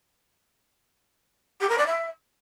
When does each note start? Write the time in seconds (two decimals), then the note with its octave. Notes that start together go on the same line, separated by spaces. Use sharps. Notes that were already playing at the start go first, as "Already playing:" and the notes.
1.60 G4
1.69 A#4
1.77 D5
1.86 E5